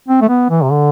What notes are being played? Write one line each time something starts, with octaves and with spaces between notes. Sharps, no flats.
C4
A3
B3
E3
C3
D3